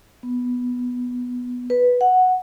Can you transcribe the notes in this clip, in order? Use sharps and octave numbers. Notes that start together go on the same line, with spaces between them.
B3
B4
F#5